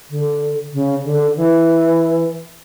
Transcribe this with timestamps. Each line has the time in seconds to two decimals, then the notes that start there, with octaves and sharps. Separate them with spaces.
0.10 D3
0.73 C#3
1.05 D3
1.36 E3